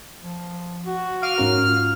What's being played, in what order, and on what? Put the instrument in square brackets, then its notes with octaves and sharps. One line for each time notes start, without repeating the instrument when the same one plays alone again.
[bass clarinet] F3
F#4
[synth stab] F5 D6 D#7 [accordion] F6
[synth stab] G#2 C#4 A#4
[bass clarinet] F4